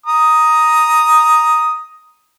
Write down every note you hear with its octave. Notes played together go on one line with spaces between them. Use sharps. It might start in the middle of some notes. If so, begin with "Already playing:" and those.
A#5 D#6